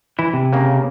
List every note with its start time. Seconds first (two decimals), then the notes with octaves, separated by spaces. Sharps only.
0.19 E3 E4
0.33 C3
0.52 C#3 A#3